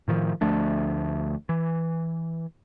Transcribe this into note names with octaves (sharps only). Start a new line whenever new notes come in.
A2 D#3 F3
D2 F3 A3 D4
E3